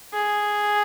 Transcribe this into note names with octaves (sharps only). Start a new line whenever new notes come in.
G#4